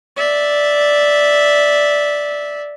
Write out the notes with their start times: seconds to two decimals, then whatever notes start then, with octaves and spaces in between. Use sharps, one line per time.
0.16 D5 E5